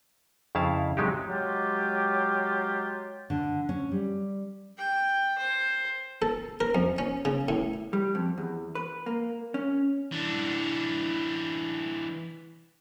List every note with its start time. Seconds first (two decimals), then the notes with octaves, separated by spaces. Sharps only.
0.55 F2 C#3 E4 F5 A5
0.97 C3 F#3 G#3 D#4 G4
1.29 F#3 G#3 F4 G4
3.30 D3
3.69 C#4
3.92 G3
4.78 G5
5.38 C5
6.22 A4
6.61 A#4
6.75 F2
6.98 C#4
7.25 C#3
7.49 A2
7.93 G3
8.15 F2
8.37 E2
8.75 B4
9.06 A#3
9.54 C#4
10.12 E3 D4